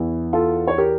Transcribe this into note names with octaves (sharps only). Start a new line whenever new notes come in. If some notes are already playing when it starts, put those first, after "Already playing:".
Already playing: E2 E3
F4 A4
C#5
G4 A#4